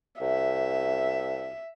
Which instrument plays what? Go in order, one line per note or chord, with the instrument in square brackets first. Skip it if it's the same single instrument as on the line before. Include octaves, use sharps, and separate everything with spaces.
[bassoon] C2 [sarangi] E5